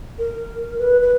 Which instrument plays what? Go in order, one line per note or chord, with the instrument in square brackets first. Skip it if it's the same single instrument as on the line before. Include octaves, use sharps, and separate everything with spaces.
[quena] A#4
B4
B4